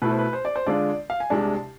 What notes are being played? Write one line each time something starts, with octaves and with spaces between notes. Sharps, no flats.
B2 A3 E4 B4
C5
B4
C5
D5
C5
D3 G#3 D4 F4 D5
F5
G#5
C2 C3 G#3 D4 A5